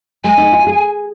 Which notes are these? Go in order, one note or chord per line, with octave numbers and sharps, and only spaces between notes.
G#3 G#5
D#4
F4
G#4